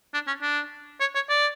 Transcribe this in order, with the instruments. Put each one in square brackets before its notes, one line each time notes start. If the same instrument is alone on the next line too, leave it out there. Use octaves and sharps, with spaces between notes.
[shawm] D4
C#4
D4
C#5
C#5
D5